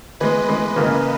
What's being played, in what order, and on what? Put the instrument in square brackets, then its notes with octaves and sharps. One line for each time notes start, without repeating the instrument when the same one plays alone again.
[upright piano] E3 G#3 B3 [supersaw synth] B4 D#5
[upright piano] E3 G#3 B3
C#3 E3 A#3